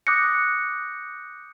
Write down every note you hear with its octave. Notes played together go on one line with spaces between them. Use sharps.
D6 D#6 F#6 G6 A#6 C#7